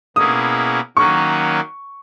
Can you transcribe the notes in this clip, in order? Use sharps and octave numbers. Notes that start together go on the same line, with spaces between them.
B2 A#3 C#4 E4 G#4 D#6
D#3 F#3 A#3 C#4 F#4 C#6